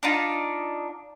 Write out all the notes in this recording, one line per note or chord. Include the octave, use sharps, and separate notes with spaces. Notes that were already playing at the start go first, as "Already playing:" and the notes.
D4 D#4 F4